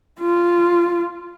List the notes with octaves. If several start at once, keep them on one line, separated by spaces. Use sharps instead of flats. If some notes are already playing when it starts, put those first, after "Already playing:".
F4